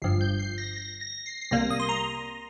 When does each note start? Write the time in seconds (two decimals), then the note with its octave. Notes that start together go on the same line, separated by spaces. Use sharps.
0.02 G1 G2 F3 C7
0.21 G6
0.39 C7
0.58 A#6
0.76 A#6
1.01 A#6
1.26 C7
1.41 C7
1.51 C2 C3 G3 A#3 A#6
1.70 D#6
1.80 C6
1.89 A#5